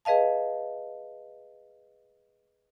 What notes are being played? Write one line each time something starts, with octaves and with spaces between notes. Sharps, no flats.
G#4 B4 D#5 F5 A5